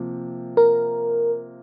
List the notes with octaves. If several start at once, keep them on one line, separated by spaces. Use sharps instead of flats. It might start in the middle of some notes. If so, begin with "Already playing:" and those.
Already playing: C3 F3 A#3
A#4